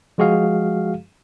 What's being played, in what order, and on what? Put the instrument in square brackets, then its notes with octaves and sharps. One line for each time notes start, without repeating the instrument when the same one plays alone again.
[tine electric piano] F3 G#3 F#4 G#4 F5